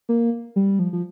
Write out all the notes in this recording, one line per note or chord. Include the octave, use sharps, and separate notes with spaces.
A#3
G3
F3
F3